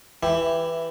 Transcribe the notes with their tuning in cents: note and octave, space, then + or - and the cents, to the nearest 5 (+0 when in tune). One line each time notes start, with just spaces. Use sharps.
E3 +0 E4 +10 G4 +0